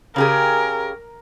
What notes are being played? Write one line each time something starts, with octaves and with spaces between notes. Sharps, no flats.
C#3 G4 G#4 A#4